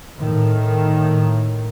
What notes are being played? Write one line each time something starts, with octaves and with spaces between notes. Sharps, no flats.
A2 D#3